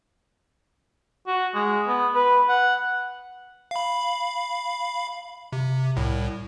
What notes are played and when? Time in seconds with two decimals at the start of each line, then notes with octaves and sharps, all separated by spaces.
1.27 F#4
1.54 G#3
1.88 B3
2.15 B4
2.49 F#5
3.71 F5 B5
5.53 C3
5.96 C2 A2